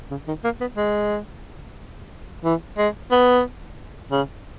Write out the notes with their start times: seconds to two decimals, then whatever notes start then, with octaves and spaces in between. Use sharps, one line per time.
0.11 C#3
0.28 D#3
0.44 A#3
0.61 B3
0.77 G#3
2.44 E3
2.78 G#3
3.11 B3
4.11 C#3